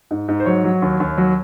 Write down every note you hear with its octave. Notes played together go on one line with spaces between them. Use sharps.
G#2
G#2
C5
F#3 C#5
F#3
D#2
D#2
F#3